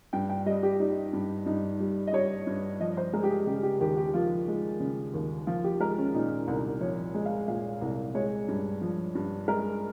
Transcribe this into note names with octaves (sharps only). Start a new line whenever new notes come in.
G2 G5
G5
G3 D#5
G4
G3 D#4
G2
G2 D#4
G3
D#5
G3 C#5
G2
F3 D#5
C5
G#3 A#4
G4
G#4
C#3 G4
G4
D#2 G4
G4
F3 F4
G#3
C#3
D#2
F3 F4
G4
G#3 A#4
C#4
A#2 D#4
C2
F3 C#5
G#3
F5
A#2 F5
C2
G#3 C#5
G2
F3
G2
G#3 A#4